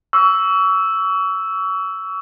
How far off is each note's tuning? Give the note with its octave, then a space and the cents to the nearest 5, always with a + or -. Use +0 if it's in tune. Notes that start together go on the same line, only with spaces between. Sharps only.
C#6 +35 E6 +0